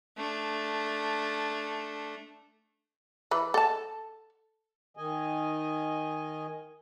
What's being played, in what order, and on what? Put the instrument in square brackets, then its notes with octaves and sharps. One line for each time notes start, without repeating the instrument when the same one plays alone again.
[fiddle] A3 D4
[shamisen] E3 B4
A4 A5
[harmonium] D#3 D#5 G#5